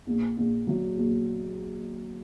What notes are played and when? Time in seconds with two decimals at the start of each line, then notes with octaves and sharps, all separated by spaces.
0.07 A#1
0.37 A#1
0.67 F#3
0.97 A#1